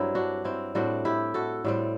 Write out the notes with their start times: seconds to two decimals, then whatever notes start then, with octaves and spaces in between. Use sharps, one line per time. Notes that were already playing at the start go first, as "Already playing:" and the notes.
Already playing: G2 F#3 C4 E4
0.15 D4 F#4
0.44 C4 E4
0.75 A2 G3 C4 D4 F#4
1.05 E4 G4
1.34 F#4 A4
1.65 A2 G3 C4